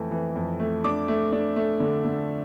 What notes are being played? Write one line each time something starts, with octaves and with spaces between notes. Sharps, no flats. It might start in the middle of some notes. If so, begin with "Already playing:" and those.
Already playing: F2 E3 A3
E3
F2
A3
D4 D6
A3
D4
A3
D3
D3